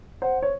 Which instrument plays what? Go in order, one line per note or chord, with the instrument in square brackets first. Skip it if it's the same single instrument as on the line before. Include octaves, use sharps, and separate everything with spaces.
[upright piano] C5 [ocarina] F#5
[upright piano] C#5